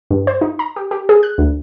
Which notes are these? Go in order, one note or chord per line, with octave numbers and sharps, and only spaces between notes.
G2
C5
D#4
A#5
G4
G4
G#4
F#6
D2